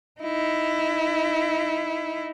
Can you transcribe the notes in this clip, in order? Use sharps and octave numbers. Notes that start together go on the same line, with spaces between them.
D#4 E4